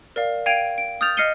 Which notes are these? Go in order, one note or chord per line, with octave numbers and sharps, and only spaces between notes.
A#4 D5 F5
F5 G5 G#6 D7 D#7 F7
D7
D#6 F6 G6 A6 F7
D#5 F6 C7 C#7 D#7 G7